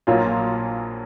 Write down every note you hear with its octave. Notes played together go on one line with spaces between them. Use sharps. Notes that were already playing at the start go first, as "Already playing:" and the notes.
A#1 A#2 F#3 A#3 F4